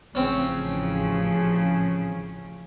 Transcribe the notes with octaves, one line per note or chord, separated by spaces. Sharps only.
A1 C#3 F3 C4 C#4